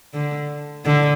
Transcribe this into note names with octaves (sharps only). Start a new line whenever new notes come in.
D3
D3